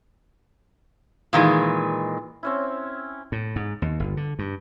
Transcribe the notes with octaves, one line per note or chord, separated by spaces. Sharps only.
A#2 D#3 E3 G#3
C4 C#4 E4
A2
G#2
D#2
G1
D3
G2